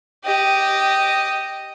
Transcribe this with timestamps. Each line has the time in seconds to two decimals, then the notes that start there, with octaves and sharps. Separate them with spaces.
0.24 G4 D#5